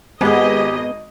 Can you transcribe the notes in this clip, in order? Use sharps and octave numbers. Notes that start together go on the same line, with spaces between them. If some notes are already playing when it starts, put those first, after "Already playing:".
G#1 B3 G4 G#4 D#5